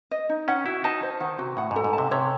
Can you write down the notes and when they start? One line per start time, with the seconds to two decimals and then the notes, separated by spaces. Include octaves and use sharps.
0.11 D#5
0.29 D#4
0.48 C#4 F#5
0.66 E4 F#4
0.84 D#4 A5
1.03 C5
1.20 D#3 F#5
1.39 C3 F#4
1.57 A2 F#5
1.71 G#2
1.76 A4
1.84 G#2
1.93 A5
1.98 C3
2.11 C3 C#5